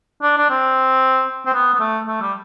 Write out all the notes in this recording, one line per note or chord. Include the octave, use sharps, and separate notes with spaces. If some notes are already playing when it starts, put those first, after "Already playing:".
D4
D4
C4
C4
B3
B3
A3
A3
G3